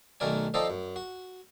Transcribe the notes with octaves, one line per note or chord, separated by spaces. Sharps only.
B1 D#3 A3 A#4 D5 G#5
F3 C4 D#4 A4 D5 D#5
F#2
F#4